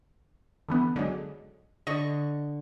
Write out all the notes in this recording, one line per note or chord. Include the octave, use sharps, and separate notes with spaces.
D3 E3 B3
D3 F#3 G#3
D3 D#5 C#6